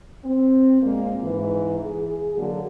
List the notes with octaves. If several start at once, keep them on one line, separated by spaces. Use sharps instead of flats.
C4
A#2 G#3 A#3
G#2 E3
G#4
D3 F#3 A#3